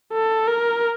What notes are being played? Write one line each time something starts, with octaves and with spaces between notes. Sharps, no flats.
A4
A#4